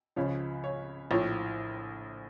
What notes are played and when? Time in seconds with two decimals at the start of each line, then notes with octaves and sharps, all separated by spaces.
0.16 C#2 C#3 F3 C#5
0.64 C#5
1.11 A#1 A2 F3 C#5